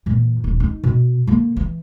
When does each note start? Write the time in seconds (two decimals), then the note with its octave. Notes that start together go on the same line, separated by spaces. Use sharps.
0.06 A#2 E3
0.44 D#1
0.60 D#4
0.84 B2
1.27 D3 A#3
1.57 E3